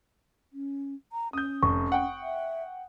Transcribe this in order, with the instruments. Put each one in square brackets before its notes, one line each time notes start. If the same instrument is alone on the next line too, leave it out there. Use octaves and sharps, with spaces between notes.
[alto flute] C#4
A#5
[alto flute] C#4 [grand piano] D#6 G6
[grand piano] F1 [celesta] C#6
[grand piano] F#5 G5
[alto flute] E5